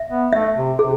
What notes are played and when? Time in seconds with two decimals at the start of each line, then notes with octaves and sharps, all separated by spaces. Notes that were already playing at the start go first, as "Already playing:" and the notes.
Already playing: E5
0.10 B3
0.33 A3 E5
0.56 C3
0.79 C3 G#4